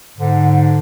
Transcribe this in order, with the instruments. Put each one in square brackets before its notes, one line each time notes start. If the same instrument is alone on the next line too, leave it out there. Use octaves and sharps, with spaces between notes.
[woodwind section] G#2 D3